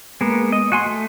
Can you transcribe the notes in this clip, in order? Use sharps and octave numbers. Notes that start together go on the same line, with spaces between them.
G#3 A#3 B3
D#5
F#4 G#5 C6
A3